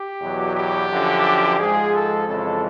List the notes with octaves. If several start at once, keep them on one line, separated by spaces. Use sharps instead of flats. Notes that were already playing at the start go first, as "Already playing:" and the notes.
Already playing: G4
E2 B2 F#3
G4
F#2 D3 F3
G#2 F3 G#3 G#4
A4
F2 C#3 E3 G#3 A4